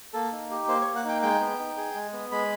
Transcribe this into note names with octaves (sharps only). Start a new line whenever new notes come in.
A#3 A4
D#4
G4
A#3 C5
C#5
A#3
F#5
D#4 G5
G#3 G5
B3
D#4
G#4
G#3
B3
G#3 B5